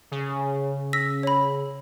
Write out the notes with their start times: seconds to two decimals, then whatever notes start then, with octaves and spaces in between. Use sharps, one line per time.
0.11 C#3
0.93 E6 A#6 B6
1.23 C#5 B5